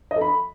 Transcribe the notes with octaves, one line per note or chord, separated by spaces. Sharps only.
D#5
A4
B5